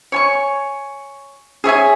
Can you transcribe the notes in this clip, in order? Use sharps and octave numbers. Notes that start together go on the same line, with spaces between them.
C#5 G#5 C#6
G#4 C#5 E5 G#5